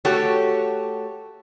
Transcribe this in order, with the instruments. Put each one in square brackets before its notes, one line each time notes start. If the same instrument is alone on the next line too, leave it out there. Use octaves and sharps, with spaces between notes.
[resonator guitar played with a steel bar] A3 F#4 G4 A4 C#5